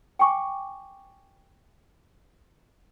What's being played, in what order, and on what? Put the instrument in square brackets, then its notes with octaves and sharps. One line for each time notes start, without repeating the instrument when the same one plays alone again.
[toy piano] G5 G#5 C#6 D6